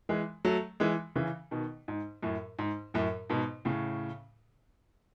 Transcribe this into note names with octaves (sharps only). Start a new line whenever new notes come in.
E3 G#3
F#3 A3
E3 G#3
C#3 E3
B2 D#3
G#2
F#2 A2
G#2
F#2 A2
G#2 B2
A2 C#3